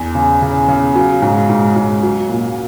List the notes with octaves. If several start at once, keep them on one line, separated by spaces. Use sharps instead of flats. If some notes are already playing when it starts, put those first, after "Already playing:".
Already playing: E2
C#3
C#3
C#3
F#3
G#2
G#2
G#2
F#3
A#2